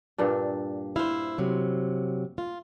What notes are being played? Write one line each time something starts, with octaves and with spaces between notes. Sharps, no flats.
G2 A#2 D4
E4 C5 F5
C3 F#3
F4